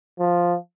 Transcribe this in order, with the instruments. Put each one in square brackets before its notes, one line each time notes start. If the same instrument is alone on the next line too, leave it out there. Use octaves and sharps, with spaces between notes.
[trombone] F3